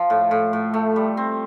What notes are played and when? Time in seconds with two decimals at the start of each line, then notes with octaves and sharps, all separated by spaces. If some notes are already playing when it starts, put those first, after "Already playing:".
Already playing: F3 F4
0.10 A2
0.31 A2
0.53 A2
0.74 A3
0.96 G3
1.17 C4